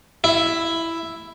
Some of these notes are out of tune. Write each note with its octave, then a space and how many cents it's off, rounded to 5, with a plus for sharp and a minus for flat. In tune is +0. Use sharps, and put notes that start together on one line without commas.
E4 +5